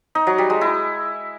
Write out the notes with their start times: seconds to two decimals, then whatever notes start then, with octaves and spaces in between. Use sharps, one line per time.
0.15 D#4
0.27 F#3
0.38 G3
0.50 G#3
0.61 E4